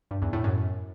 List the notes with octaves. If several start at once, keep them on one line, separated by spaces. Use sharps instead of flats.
G2
E2
A2
F#2